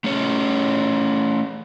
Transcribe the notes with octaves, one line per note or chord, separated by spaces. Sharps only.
A3 C#4 G#4 C#5